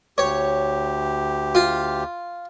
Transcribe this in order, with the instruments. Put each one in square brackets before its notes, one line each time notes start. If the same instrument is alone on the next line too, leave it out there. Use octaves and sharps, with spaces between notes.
[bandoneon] D2 G4 [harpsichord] C#5
[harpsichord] F4